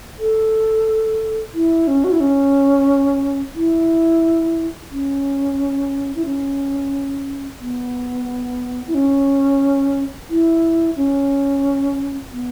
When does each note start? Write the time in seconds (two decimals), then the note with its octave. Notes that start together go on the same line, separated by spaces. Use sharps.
0.19 A4
1.54 E4
1.87 C#4
2.04 F#4
2.12 E4
2.20 C#4
3.55 E4
4.91 C#4
6.15 E4
6.25 C#4
7.60 B3
8.87 E4
8.94 C#4
10.29 E4
10.96 C#4
12.31 B3